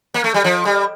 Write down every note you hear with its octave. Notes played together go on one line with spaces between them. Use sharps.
A#3
A3
G3
F3
G3